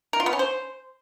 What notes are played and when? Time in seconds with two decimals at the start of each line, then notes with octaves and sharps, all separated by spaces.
0.13 A#4
0.20 F4
0.26 B3
0.33 C#4
0.39 C5